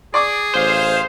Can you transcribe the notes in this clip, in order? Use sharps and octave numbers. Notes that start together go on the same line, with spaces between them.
G#4 D5 C#6 D6
A1 C5 F5